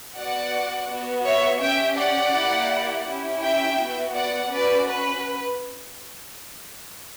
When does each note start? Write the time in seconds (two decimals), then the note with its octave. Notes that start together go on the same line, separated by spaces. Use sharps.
0.16 B3 F#4 D5 F#5
0.89 B3 F#4
1.25 C#5 E5
1.61 C#4 G4 E5 G5
1.97 D5 F#5
2.34 A#3 E4 G4
3.06 C#4 E4 G4
3.43 E5 G5
3.79 B3 F#4
4.15 D5 F#5
4.51 C#4 F#4 B4 D5
4.88 B4